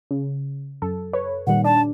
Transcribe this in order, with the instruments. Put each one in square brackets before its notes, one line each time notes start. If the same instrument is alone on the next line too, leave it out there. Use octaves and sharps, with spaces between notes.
[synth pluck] C#3
F#2 A4
B4 C#5
[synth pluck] A#2 D#3 G3 [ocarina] F#5
[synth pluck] D4 [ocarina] A5